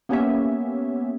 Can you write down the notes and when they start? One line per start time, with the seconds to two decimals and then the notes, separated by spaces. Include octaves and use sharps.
0.09 A#3 B3 C#4 G4 C#5 E5